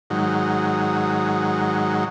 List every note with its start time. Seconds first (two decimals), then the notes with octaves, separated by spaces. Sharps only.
0.10 G#2 D#3 F#3